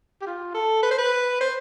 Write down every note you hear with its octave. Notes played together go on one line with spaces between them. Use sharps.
G4
F4
A4
B4
C5
B4
C5